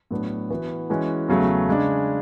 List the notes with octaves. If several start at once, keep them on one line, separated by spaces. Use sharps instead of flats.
A2 F#3 B3 D4
E3 B3 F#4 B4
E3 G#3 C#4 F#4
E2 C#3 F#3 A3
C#3 G#3 D4